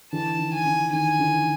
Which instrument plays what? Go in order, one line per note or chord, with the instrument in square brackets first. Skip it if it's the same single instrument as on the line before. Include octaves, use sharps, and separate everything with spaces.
[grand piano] D3 E3 [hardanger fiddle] A5
[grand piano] D#3
[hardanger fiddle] G#5
[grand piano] D3
[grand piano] D#3 [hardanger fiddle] G#5
[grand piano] D3 E3